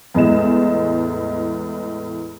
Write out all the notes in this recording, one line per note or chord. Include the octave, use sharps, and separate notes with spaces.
E2 A2 G#3 E7